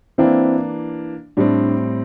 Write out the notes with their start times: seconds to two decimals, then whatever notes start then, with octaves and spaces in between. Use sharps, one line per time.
0.18 E3 A#3 C4 D4 E4
1.37 A2 G3 C4 D4